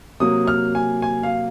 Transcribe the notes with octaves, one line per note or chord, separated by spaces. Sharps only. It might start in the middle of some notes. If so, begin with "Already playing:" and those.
C3 F#3 A#3 D#6
F6
G#5
G#5
F5